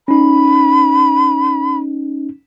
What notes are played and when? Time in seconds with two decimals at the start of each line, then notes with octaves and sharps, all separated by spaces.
0.08 C#4 D#4 B5